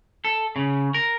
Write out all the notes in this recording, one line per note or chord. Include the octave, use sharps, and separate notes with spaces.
A4
C#3
A#4